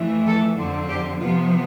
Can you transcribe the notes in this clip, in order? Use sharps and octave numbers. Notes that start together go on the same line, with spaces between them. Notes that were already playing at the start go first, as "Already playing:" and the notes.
Already playing: F2 E3 A3
A4
F2 D3 F3 C4
G4
C3 F3 B3 F4